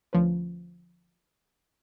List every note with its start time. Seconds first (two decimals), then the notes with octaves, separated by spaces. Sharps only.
0.13 D2 F3 C#4 B4